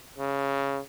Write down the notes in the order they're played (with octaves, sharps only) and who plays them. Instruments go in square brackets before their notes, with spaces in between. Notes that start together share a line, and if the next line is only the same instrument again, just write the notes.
[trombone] C#3